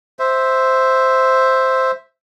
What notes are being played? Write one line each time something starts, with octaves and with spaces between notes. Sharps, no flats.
C5 E5